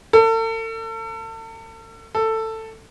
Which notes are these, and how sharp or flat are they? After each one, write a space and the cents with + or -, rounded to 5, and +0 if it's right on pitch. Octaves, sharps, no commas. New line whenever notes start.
A4 +40
A4 +15